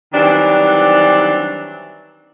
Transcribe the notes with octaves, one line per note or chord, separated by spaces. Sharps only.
D#3 E3 F#3 G3 C4 D4